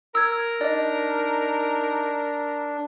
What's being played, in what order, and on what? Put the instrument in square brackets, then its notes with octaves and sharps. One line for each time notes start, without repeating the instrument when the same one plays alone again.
[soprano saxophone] A#4 [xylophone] E6 G#6
[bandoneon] D4 [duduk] D#4 [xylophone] D5 D#5